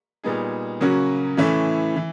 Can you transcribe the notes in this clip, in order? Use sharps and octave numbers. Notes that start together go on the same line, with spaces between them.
A#2 G3 B3 D#4 G#4
C#3 F#3 A#3 C#4 F#4
A2 E3 A3 C#4 E4
E3